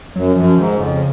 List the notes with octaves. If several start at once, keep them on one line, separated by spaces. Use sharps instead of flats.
F#2 F#3
F#2 F3
G#2 D#3
F2 C#3